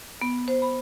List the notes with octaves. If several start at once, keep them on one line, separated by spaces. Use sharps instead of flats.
B3
C5
B5